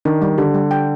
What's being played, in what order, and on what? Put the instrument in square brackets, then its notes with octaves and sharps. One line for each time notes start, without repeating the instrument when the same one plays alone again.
[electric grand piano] D#3 [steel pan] D4
[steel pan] G3
[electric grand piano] D3 [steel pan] G4
[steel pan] G3
G5